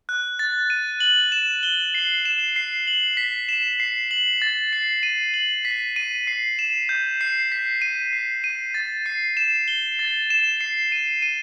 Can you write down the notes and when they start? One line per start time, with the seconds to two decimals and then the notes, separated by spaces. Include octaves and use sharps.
0.09 F#6
0.39 A6
0.70 D#7
1.00 F#7
1.32 E7
1.63 G7
1.94 C7
2.25 E7
2.56 C7
2.87 F#7
3.17 B6
3.49 E7
3.80 C7
4.11 F#7
4.42 A6
4.73 C7
5.03 D#7
5.34 F#7
5.65 B6
5.96 D#7
6.27 C7
6.59 E7
6.89 G6
7.21 C7
7.52 B6
7.82 D#7
8.13 C7
8.44 D#7
8.74 A6
9.06 C7
9.37 E7
9.68 G7
9.99 A6
10.30 E7
10.61 C7
10.92 D#7
11.22 D#7